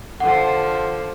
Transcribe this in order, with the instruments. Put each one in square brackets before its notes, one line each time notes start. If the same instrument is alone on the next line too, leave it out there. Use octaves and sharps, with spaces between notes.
[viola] D3 F3 [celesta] F#5